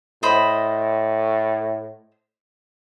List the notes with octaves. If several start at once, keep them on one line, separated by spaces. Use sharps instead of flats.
A2 C5 D#5 B5